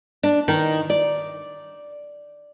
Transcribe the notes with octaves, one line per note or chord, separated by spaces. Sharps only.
D4
D#3
D5